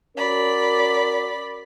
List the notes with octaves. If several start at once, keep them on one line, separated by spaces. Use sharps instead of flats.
C#4 F#4 A#4 D5 B5